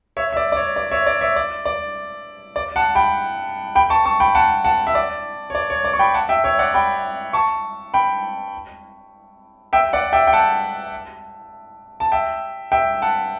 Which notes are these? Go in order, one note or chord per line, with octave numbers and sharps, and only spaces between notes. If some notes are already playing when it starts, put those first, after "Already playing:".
C#5 E5
E5
D5
D5
C#5
D5
C#5 E5
D5
C#5 E5
D5
D5
D5
F#5 A5
G5 B5
G5 B5
A5 C#6
A5 C#6
G5 B5
F#5 A5
F#5 A5
E5
D5
C#5
D5
C#5
D5
C#6
G5 B5
F#5 A5
E5 G5
C#5 E5
D5 F#5
G5 B5
A5 C#6
G5 B5
E5 G5
D5 F#5
E5 G5
G5
F#5 A5
A5
E5 G5
E5 G5
F#5 A5